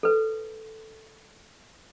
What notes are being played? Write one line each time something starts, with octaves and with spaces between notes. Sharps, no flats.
A4 B4